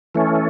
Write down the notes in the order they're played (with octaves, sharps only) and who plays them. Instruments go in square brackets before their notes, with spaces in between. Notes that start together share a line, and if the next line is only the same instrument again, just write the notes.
[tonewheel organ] E3 A3 C#4